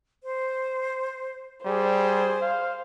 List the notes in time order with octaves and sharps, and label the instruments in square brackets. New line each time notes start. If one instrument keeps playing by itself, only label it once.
[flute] C5
[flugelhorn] G3 [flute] G#4 [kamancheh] C5
[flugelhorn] F5